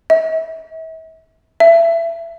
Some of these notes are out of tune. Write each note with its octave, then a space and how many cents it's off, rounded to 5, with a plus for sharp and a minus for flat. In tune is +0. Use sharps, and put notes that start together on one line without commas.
E5 -40
E5 +25